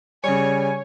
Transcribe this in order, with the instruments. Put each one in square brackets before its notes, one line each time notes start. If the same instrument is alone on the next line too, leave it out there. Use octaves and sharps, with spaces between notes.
[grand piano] C#3 G3 [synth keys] C#5 [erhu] G#5